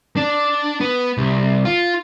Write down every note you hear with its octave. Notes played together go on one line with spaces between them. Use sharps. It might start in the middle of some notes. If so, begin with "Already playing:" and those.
D4
B3
C2
F4